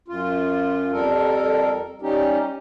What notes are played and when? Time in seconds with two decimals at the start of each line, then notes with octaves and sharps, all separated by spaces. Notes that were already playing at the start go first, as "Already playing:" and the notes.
0.08 F#2 F4
0.92 F2 G3 A4 A#4
2.02 G3 C#4 D#4 G4